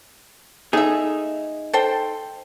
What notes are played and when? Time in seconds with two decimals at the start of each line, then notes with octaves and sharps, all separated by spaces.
0.73 A3 D#4 G#4 E5
1.73 A4 C5 G5